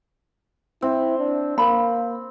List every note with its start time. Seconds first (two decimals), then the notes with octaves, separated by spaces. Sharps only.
0.82 C4 E4
1.18 D4
1.58 A#3 B5